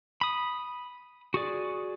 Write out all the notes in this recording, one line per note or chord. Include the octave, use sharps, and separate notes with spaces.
B5 D#6
F#4 G#4 D5